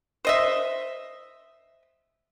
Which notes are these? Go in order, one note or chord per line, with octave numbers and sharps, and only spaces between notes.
C5 D#5 E5